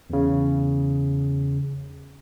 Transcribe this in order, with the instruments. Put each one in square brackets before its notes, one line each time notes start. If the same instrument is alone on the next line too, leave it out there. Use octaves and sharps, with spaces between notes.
[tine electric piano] E2 C#3